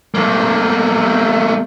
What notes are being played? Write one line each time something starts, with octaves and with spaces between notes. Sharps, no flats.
A3 A#3